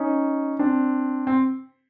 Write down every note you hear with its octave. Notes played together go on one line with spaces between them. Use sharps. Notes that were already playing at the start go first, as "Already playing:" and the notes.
Already playing: C#4 D#4
C4 D4
C4